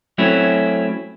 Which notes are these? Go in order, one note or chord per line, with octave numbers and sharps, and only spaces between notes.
F#3 A3 C4 C#4 E4